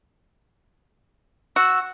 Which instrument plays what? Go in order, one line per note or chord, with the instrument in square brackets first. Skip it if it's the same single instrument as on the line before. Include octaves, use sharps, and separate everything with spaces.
[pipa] F#4 [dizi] E6